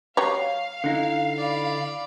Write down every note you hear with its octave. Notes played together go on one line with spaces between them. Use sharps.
F#3 G4 C#5 F5
D3 D#4 E4
D5 B5